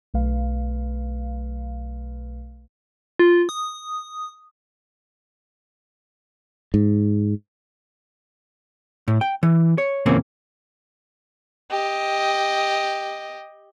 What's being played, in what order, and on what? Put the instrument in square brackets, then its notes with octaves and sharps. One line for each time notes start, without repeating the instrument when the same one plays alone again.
[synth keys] B1 A3 B4 F5
[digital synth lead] F4
D#6
[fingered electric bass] G#2
[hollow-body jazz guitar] A2
G5
E3
C#5
E2 A#2 C#3 A#3 C4 C#4
[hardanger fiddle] G4 D#5